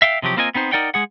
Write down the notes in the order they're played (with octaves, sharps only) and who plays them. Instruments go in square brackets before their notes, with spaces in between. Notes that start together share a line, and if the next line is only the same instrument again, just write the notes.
[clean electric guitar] E5 F5 G5
C3 F3 F#3 G4
A#3 C4 F4 A#4 D#5 G#5
B3 C4 D#4 C5
D#4 A#4 D5 F#5 G5
G#3 G#4 F#5